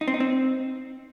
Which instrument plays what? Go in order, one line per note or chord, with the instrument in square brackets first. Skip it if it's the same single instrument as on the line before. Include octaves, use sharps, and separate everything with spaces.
[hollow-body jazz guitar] D#4
C4
D#4
C4